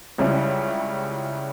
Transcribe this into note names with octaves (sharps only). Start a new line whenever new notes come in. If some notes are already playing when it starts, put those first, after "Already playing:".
C#2 C#3 G3 C#4 E4